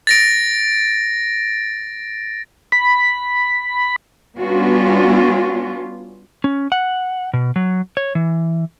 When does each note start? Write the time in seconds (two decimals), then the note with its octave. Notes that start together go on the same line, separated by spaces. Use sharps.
0.07 A6 A#6 D7
2.72 B5
4.38 G3 B3 C#4 D4 F4 F#4
6.44 C#4
6.72 F#5
7.33 B2
7.56 F#3
7.97 C#5
8.15 E3